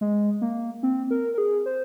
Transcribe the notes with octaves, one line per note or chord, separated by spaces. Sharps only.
G#3
A#3
C4
A#4
A#4
G#4
C5